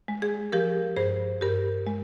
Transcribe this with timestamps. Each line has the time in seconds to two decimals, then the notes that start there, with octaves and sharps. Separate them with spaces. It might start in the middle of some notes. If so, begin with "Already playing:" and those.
0.08 G#3
0.22 G#4
0.52 F3 G4 A#4
0.97 G2 G#4 C5
1.41 G2 G4 A#4
1.87 G#3